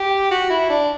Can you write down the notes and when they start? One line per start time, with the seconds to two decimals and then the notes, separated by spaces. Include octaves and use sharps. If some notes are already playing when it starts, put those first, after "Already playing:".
Already playing: G4
0.31 F#4
0.50 E4
0.69 D4